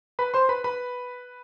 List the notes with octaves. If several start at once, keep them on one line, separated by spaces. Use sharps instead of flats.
B4 B5
C5 C6
B4 B5
B4 B5